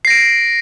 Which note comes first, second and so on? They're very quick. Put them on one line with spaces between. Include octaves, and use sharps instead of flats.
C7 A#6 D7